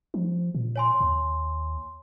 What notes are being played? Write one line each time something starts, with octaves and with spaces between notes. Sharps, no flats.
F3
A#2
C#5 G#5 C6
D#2